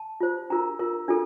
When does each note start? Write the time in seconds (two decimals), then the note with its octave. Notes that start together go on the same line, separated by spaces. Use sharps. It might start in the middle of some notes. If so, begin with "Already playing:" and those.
Already playing: A5
0.20 F4 C5
0.50 D4 F4 A#4 A#5
0.79 F4 A#4
1.08 D4 F4 A4